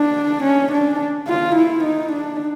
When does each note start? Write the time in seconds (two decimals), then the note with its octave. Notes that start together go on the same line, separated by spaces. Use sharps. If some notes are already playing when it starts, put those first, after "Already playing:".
Already playing: D4
0.44 C#4
0.72 D4
1.28 F4
1.56 E4
1.84 D#4
2.13 D4